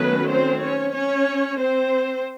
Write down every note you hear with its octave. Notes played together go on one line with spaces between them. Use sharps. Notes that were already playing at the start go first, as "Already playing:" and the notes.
Already playing: D#3 F#3 A3 B3 C#4 B4
C4 C5
C#4 C#5
C#4 C#5
C4 C5